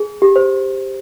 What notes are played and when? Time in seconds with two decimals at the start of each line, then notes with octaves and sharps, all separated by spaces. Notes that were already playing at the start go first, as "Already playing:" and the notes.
Already playing: G#4
0.22 G4
0.36 C5